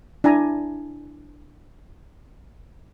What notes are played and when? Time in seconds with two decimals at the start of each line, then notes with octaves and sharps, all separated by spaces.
0.24 D4 E4 G#5 A#5